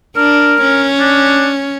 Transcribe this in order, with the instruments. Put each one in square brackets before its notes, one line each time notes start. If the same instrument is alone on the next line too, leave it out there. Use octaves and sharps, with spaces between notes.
[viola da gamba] D4 [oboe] A#4
[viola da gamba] C#4
[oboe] D4